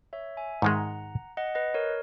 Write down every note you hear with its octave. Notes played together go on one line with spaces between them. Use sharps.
C#5 E5
E5 G#5
G#2 D#3 G#3 F#5 A#5
D#5 F#5
B4 D#5
A#4 C#5